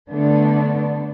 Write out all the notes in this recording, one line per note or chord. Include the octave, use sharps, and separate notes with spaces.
D3 A3 B3 D4